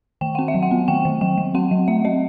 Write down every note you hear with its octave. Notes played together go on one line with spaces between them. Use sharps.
D#3 G5
C4 F#5
E5
F#3
F#5
B3
D#3 G5
D#3
F#3 G5
F#3
C4 F#5
F#3
A3 E5
C4 D#5